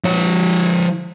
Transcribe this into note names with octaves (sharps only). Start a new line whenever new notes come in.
F3 C#5